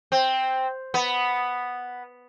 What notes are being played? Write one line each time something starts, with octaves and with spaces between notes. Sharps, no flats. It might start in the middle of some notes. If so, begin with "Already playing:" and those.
C4
B3